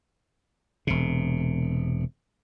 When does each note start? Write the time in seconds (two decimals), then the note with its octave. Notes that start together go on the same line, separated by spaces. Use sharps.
0.87 E1 C3